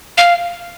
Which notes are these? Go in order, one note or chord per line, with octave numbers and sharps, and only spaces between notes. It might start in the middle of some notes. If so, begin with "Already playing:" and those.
F5